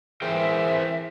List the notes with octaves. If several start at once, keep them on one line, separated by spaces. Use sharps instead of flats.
E3 G#4 A#4 C5 E5 G5